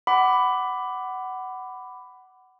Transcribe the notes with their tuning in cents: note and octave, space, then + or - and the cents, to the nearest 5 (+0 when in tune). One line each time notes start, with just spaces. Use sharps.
F#5 +20 B5 +15 D6 +0